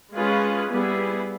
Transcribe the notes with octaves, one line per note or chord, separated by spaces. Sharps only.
G#3 C#4 F4 G#4 B4
G3 B3 E4 G#4